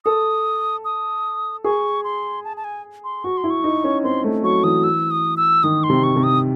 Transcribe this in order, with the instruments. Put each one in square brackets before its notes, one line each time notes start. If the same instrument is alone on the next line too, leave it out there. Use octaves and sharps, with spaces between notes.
[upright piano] A4 [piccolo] D#6
[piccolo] D#6
[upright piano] G#4 [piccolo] C#6
[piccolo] C6
A5
A5
G#5
C6
[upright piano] F#4 [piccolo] C#6
[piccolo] C6
[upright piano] E4
[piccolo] C#6
[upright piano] D#4
C#4
[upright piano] C4 [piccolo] C6
[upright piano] A3
[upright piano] F#3 [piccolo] C#6
[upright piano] E3 [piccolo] D#6
[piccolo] E6
D#6
E6
[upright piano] D#3 [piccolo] D#6
[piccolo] C6
[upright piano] C3
[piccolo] C#6
[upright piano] C3
[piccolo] D#6